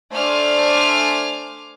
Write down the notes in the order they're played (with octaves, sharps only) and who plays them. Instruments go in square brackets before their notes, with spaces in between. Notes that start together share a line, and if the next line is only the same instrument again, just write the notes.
[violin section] A3 D4 C5 G#5 D6 F6